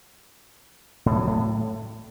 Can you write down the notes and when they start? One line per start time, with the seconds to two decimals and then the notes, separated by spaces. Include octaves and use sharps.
1.06 A2
1.17 F#3
1.27 A2